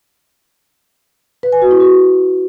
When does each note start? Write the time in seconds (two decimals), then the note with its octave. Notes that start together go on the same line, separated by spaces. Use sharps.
1.43 B4
1.52 G#5
1.62 F#4
1.71 E4
1.80 F#4